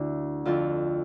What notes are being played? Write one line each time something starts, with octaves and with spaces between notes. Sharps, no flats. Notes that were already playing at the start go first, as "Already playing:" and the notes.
Already playing: D2 D3 D4 E4
F2 D3 F4